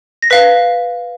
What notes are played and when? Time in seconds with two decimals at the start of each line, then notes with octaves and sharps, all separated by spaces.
0.22 A#6
0.30 B4 F5 B6